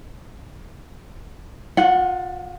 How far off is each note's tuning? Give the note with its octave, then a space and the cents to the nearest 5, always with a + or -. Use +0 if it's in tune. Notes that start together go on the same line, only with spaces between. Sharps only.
F4 +30 F#5 +0